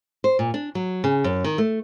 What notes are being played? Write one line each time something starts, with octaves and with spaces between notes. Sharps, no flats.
C5
A#2
D4
F#3
C#3
F#2
D#3
A3